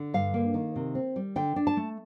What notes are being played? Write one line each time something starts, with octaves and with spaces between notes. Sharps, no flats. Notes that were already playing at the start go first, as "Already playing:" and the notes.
Already playing: D3
G2 F5
A#3
D#3
C3
C4
G3
D3 G5
D4
A5
A3